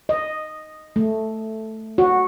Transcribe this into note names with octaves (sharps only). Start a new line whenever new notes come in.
D#5
A3
F#4